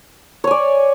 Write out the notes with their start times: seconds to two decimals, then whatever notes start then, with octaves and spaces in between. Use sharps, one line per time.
0.44 C#5
0.47 G#5
0.51 D5